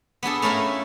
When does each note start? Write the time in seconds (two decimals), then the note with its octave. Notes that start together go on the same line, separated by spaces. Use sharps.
0.23 B3 D4 G#4 A4
0.42 A3 C#4 E4 A#4 F5